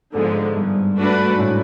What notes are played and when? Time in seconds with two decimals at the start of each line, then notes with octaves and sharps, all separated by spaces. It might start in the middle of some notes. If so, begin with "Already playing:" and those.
0.14 G#2 D3 F3 G#3 B3
0.56 G2
0.98 A3 D4 F#4 B4
1.30 G#2
1.40 A2